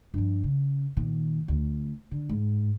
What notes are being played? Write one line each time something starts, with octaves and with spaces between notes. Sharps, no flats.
G2 F3
C#3
A#2 D#3
D2
D3
G#2